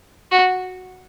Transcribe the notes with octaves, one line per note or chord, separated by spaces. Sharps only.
F#4